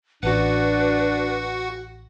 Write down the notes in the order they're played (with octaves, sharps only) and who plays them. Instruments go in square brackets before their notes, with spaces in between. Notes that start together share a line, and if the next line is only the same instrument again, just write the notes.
[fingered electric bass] A1 [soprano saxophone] D4 [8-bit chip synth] F#4 F#5 [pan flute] B4